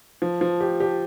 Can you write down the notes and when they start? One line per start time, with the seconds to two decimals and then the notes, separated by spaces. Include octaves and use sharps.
0.22 F3
0.41 F3
0.61 G4
0.80 G4